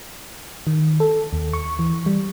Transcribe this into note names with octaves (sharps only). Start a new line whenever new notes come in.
D#3
A4
D#2
C#6
E3
G3